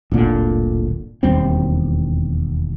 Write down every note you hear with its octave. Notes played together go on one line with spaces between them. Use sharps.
D1 G1 A#2 D3
E1 D#2 G3 C4